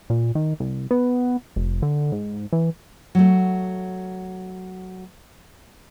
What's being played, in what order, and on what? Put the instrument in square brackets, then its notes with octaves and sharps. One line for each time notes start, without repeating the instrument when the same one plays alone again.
[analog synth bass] A#2
D#3
C2
B3
F1
D3
G#2
E3
[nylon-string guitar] F#3 A3